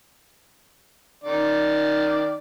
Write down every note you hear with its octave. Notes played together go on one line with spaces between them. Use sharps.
D#3 D5